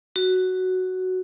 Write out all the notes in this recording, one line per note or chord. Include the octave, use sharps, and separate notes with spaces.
F#4